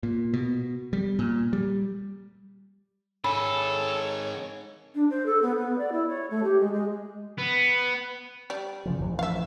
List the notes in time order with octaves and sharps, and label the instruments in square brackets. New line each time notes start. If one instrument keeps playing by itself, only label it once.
[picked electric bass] A#2
B2
G3
A#2
G3
[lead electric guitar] D#3 G#4 [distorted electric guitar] A4 [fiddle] C#5 [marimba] B5
[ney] D4
C5
A4
B3
B3
D5
E4
C#5
A3
G4
G#3
G#3
[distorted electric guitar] B3
[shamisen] G3 D5
[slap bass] C#3 E3 F3
A1 F2 E3
[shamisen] E5 F5